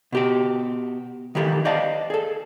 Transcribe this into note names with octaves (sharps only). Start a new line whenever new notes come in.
B2 G4 G5
D#3 E3 G4 A4
C5 D5 D#5 F5 G5 A5
G#4 A4